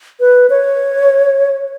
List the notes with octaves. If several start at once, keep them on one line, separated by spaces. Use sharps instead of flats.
B4
C#5